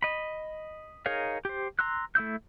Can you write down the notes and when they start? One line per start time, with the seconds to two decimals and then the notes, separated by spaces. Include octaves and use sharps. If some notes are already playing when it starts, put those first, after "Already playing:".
0.02 D#5 B5
1.06 D#4 G#4 A#4 C#5 F5
1.45 G4 C5
1.79 A#5 C6 E6 F#6
2.15 A3 E4 E6 G6